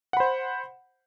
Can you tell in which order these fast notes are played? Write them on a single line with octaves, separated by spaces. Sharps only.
F#5 B5 C5